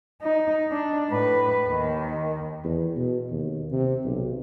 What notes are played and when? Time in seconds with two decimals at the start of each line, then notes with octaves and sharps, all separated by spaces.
0.22 D#4
0.72 D4
1.09 A2 B4
1.68 D#2 D#3
2.64 E2
2.97 B2
3.31 D#2
3.71 C3
4.05 B1